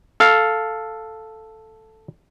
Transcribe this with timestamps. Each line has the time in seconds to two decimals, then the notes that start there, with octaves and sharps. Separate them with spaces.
0.20 A4 F5